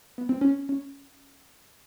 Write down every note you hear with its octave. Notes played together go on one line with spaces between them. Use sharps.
B3
C4
C#4
C#4